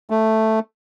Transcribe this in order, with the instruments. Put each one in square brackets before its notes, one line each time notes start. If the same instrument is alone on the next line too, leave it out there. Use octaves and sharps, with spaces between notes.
[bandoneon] A3